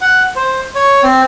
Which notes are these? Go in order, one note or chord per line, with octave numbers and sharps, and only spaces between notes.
F#5
C5
C#5
C4